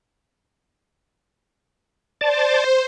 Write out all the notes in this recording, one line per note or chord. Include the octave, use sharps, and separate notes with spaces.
C5 D5 A5